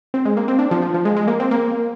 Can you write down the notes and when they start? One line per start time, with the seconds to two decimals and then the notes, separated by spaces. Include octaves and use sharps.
0.14 C4
0.25 G#3
0.37 A#3
0.48 C4
0.59 D4
0.71 F3
0.82 F3
0.94 F3
1.05 G#3
1.17 G#3
1.28 A#3
1.40 C4
1.51 A#3